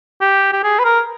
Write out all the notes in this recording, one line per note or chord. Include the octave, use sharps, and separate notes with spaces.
G4
G4
G#4
B4
A#4